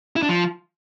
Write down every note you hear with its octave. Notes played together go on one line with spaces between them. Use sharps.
E4
D4
F3